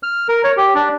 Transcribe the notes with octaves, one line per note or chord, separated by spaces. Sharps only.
F6
A#4
C#5
G4
D4